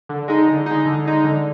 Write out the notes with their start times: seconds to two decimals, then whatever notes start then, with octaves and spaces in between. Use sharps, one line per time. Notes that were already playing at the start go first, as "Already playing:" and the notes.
0.09 D3
0.28 G#3 D#4
0.48 D3
0.66 G#3 D#4
0.86 D3
1.05 G#3 D#4
1.24 D3